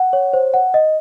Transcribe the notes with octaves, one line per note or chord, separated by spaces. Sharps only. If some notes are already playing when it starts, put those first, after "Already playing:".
Already playing: F#5
C#5
C5
F#5
D#5